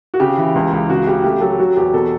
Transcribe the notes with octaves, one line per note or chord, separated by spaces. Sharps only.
F#4
C#3 G4
E3
C#2
C#2
C#3 F#4
C#3 G4
A3 G4
F#3 A4
F#3 F#4
E2 G4
B2 A4